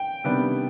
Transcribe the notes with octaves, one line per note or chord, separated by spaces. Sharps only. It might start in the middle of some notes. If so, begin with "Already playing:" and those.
Already playing: G5
C3 D#3 G3 B3 D4